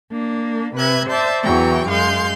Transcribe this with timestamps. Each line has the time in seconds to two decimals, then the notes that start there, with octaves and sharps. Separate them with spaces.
0.13 A#3 D4
0.75 C3 B4 E5 F#6 G#6
1.08 C5 D5 E5 A5 G6
1.43 E2 E3 F#3 G5 C#6
1.89 F#2 G#3 F5 C6 G6